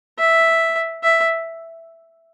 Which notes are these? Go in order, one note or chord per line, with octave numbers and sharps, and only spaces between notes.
E5
E5